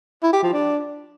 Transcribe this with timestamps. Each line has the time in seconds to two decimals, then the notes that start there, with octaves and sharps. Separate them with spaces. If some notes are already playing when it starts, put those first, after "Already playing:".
0.23 E4
0.33 G4
0.43 F3
0.53 D4